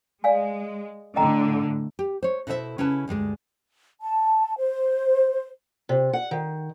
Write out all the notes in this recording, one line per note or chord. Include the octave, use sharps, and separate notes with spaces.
G#3 D5 F5 G#5
A2 D3 D#5 G5 A#5
G4
C5 C#5
B2 E4 A4 C5 D#5 E5
C#3 C#4 E4 B4 A5
D2 G2 G#3 D5
A5
C5
C3
F#5
D#3